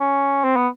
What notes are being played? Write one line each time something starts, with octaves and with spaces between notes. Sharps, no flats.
C#4
C4
B3